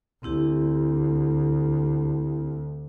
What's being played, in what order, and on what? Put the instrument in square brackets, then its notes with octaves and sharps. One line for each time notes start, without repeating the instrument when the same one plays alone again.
[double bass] D2 [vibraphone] C4 E4 G4